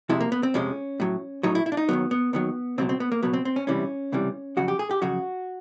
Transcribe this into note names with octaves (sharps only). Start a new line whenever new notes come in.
F2 C3 F3 G#3 E4
A#3
B3
C4
F2 C3 F3 G#3 C#4
A2 F#3
A2 F#3 D#4
E4
E4
D4
D#4
D#2 D#3 F#3 B3
B3
D#2 D#3 F#3 B3
C#2 B2 F#3 C4
C4
B3
A#3
C#2 B2 F#3 B3
C4
C4
C#4
C#2 C3 E3 G3 C#4
C#2 C3 E3 G3
F2 C#3 F#3 F#4
G4
G#4
G4
F2 C#3 F#3 F#4